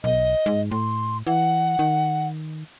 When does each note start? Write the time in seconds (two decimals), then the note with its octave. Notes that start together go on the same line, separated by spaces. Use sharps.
0.04 B1 D#5
0.46 G#2
0.71 A2 C6
1.27 E3 F#5
1.79 D#3